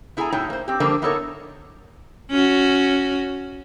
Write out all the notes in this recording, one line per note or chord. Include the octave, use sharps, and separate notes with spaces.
B3 E4 G#4 A4 G#5 A#5
A2 F#3 D#4 C#5 G5
A#3 C5
C4 G4
D3 F3 G3 A#3 D4 C5
B3 D#4 E4 A4 A#4 C#5
C#4 F#4